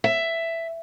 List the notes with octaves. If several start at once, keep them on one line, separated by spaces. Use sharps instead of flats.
E5